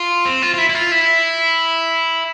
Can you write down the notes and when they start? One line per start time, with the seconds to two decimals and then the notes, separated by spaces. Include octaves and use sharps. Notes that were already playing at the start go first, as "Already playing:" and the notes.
Already playing: F4
0.25 C4
0.42 F4
0.54 F4
0.58 E4
0.69 E4
0.75 F4
0.91 E4